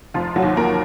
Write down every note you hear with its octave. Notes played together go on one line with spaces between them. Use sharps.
F1 F3 F4
F#3 F#4
D#2
A#3 A#4